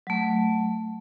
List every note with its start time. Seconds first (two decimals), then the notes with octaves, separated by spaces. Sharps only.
0.07 F#3 A3